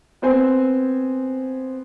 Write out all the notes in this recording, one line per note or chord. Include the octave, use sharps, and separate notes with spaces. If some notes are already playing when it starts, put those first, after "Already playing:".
B3 C4 C5 G#5